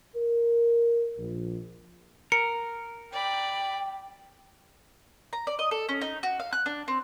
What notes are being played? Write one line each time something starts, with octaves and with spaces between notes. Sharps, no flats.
A#4
A#1
A#4 C#7
D5 G5 B5
A#5
D5
D#5
A4
C#4
D#4
F#4
F5
F#6
D4
C4